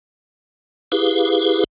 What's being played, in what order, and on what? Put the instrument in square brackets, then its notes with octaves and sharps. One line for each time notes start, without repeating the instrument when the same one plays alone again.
[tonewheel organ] E4 G4 G#4 B4 F5